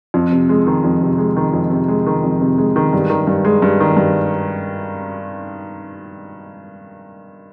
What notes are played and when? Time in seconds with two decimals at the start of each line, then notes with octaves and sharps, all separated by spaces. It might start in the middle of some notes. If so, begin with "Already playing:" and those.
0.14 F2
0.32 C3
0.49 G#3
0.67 D#3
0.84 F2
1.02 C3
1.18 G#3
1.37 D#3
1.53 F2
1.70 C3
1.88 G#3
2.06 D#3
2.24 F2
2.41 C3
2.58 G#3
2.76 D#3
2.93 G2
3.10 D#3
3.27 G2
3.45 G#3
3.62 G2
3.80 D#3
3.97 G2